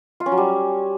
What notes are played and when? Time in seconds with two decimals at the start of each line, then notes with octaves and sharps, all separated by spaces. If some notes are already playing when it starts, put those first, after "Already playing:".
0.20 F4
0.26 C#4
0.32 F#3
0.38 G3